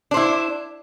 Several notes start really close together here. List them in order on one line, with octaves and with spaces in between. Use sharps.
D4 C5 E4